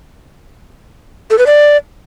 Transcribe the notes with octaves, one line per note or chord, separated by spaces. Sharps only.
A4
B4
D5